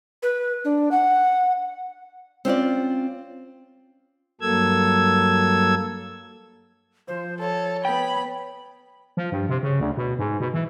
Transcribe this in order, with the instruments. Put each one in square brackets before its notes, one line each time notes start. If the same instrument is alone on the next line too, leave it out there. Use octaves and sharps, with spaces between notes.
[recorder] B4
D4
F#5
[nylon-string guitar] C4 C#4 F4 D5
[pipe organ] G2 F#3 A#3 A4 E6 G#6
[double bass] F3 [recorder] C5
[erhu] A4 [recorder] C#5
[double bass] B3 [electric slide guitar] G5 [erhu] B5
[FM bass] F3
G2
C3
C#3
D2
B2
G#2
B2
E3